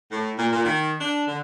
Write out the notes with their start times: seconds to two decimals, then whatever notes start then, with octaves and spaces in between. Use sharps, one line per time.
0.11 A2
0.38 A#2
0.53 A#2
0.65 D#3
1.01 D4
1.28 D3